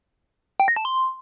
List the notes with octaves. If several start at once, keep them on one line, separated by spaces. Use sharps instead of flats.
G5
A#6
A5
C6